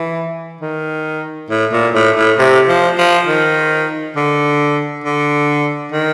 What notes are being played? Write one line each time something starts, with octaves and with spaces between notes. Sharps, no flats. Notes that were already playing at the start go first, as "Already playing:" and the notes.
Already playing: E3
D#3
A2
A#2
A2
A2
C3
F3
F3
D#3
D3
D3
D#3